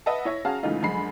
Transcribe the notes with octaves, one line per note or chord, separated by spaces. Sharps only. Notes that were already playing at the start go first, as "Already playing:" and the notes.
B4 D#5 E5 F#5 A5
E4 C#5 E5 A#6
C#4 F#4 G#4 F5 A5 A#5
G#2 C#3 E3 A3 D#4 F4
F#2 D3 F3 G#3 B5 C7